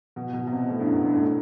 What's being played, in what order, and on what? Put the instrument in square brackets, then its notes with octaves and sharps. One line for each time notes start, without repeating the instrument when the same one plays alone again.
[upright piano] B2
B2
B2
C3
A2
G2
F#2
G2
A2